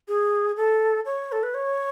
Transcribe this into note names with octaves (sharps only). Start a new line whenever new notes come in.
G#4
A4
C#5
A4
B4
C#5